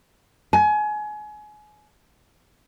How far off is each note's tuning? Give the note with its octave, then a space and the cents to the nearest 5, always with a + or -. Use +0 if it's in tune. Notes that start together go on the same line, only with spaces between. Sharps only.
G#5 +25